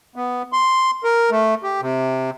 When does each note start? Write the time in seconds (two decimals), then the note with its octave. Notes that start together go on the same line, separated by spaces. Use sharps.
0.16 B3
0.53 C6
1.04 A#4
1.31 A3
1.63 G4
1.81 C3